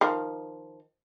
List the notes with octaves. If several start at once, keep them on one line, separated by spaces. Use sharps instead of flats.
D#3 F3